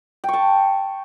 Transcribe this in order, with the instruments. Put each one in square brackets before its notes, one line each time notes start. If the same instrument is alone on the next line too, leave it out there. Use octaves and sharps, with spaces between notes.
[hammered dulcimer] G5
C#6
A5